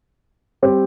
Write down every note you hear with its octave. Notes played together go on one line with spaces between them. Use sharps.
G3 C4 G4